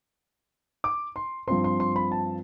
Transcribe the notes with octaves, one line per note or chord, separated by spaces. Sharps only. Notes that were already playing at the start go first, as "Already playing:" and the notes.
D6
C6
G2 F3 C4 C6
C6
C6
B5
A5